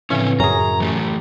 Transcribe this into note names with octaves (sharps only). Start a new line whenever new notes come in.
A2 C#3 E3 F3 C4 C#4
F#2 C#4 G#4 A#5
E3 A3 G4